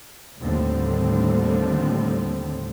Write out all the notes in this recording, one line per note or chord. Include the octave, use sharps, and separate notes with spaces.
D#2 A2 D3 G3 C4